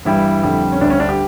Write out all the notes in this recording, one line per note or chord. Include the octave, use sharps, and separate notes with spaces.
G2 E3 G3 E4
F2 D3 G3
C#4
D2 D3 G3 D4
C#4
D4
G4